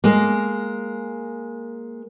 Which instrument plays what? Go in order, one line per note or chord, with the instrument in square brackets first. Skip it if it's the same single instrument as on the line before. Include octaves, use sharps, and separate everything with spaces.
[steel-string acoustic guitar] G#3 A#3